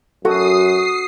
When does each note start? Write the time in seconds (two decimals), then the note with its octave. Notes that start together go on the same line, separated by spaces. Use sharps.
0.25 F#2 F#4 A4 D#6 C7